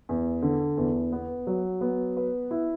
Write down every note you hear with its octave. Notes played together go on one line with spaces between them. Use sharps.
E2
D3
E2
B3
F#3
B3
B4
E4